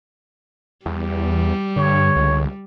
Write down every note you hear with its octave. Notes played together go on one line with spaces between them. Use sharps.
E2 G3
G2 D3 C#5
C#2